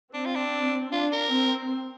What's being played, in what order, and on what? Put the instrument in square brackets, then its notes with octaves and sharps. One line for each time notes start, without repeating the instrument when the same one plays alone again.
[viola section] C4 [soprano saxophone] D4
[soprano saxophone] F4
D4
[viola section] D4 [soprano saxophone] F4
[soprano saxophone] A#4
[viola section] C4